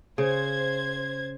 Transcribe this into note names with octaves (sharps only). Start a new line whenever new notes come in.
C#3 C5 G#6